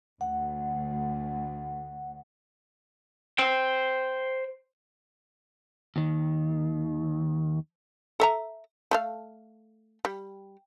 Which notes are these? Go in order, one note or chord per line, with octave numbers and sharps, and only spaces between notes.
D2 F#5
C5 G5
D#2 D#3
A4 E5 A#5
A3 A4 F5
G3